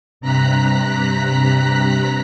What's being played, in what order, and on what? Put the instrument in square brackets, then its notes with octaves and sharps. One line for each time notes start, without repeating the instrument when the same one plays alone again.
[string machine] G2 C3 A#5 F#6 B6